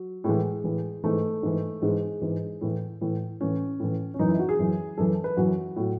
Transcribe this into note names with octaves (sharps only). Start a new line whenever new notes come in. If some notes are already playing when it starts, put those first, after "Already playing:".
Already playing: F#3
A2 E3 G#3
A2 E3
G#2 E3 A3
G#2 E3
G#2 E3 G#3
G#2 E3
A2 E3
A2 E3
A2 E3 C#4
A2 E3
C#4
F#2 E3 D#4
E4
F#4
G#4
F#2 E3
F#2 E3 A4
B4
F#2 E3 F#4
A2 F#3